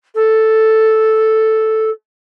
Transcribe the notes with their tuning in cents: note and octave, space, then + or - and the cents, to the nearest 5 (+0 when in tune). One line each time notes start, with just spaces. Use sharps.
A4 +0